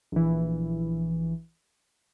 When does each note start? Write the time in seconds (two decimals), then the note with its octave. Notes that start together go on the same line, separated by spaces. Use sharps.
0.12 A#1 E3